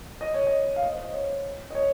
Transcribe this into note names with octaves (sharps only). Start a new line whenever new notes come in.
D#5
C#5
D#5
F5
D#5
C5
D#5
C#5
D#5
C#5